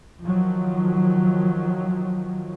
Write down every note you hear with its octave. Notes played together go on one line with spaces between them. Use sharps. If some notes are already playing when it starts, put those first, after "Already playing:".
D#3 F3 F#3